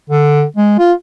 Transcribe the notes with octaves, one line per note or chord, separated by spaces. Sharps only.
D3
G#3
F4